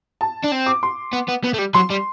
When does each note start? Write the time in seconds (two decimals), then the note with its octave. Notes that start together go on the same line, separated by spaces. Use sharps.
0.21 A5
0.44 D4
0.52 C4
0.66 D6
0.83 C6
1.13 B3
1.29 B3
1.44 B3
1.54 A3
1.59 G3
1.74 F#3 C6
1.90 G3